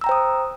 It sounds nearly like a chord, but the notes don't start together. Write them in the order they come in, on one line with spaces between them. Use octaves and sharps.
E6 A#5 G5 C5 D#6